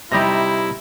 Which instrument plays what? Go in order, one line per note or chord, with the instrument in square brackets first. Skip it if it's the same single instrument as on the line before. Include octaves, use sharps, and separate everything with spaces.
[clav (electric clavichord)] C3 D#4 G4 [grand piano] G3 A#6 [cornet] E4